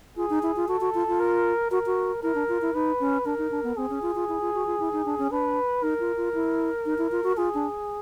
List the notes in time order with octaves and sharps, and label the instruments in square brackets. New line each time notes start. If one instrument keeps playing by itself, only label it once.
[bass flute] F4 [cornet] G#4
[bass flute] D#4
E4
F4
[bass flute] F#4 [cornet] A4
[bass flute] F#4
F4
F4
[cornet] A#4
[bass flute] F#4 [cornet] A#4
[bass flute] F#4
[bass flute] E4 [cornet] A#4
[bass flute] D4
F4
E4
[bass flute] D#4 [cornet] B4
[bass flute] C#4
[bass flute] D4 [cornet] A#4
[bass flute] D#4
D4
B3
[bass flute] C4 [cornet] G#4
[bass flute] C#4
F4
F4
E4
F4
F#4
F4
E4
D#4
D4
C#4
[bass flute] D4 [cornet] B4
[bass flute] D#4 [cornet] A#4
[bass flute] F4
F4
E4
D#4
E4
F4
F#4
[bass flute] F4 [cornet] G#4
[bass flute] D4